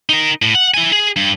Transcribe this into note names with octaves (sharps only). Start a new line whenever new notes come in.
D#4 A#4
A2
F#5
E4 G#5
G#4
G2